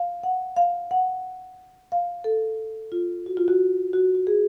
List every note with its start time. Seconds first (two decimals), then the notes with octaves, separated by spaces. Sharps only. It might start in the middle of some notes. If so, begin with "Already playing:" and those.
Already playing: F5
0.23 F#5
0.56 F5
0.91 F#5
1.92 F5
2.24 A4
2.92 F4
3.26 F#4
3.37 F4
3.48 F#4
3.93 F#4
4.15 F#4
4.27 G#4